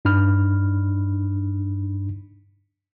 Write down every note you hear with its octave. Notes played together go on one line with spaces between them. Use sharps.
G2 D4 D#4 B5 F6